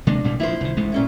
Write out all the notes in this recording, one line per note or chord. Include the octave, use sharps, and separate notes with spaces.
C3 G#3 A#3 D4
A1 A#2 G3
A#2 F3 E4 C5
C2 D#3
A1 G#3 A3
A#2 C#4 E4